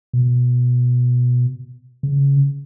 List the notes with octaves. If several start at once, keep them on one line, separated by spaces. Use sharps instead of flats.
B2
C#3